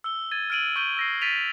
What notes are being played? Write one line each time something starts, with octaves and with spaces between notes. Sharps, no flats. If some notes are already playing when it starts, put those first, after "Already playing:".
E6 G7
G#6 A6 D#7
F6 G#6 D7 D#7 F#7
C#6 E6 G6 D7 D#7 G7
E6 A#6 C7
A6 B6 D7 D#7 F7